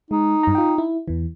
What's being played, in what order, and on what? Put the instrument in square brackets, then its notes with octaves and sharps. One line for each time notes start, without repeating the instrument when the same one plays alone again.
[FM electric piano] G#3 [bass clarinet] D#4
[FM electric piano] G2 A#5
F4 G5
E4
E2 E3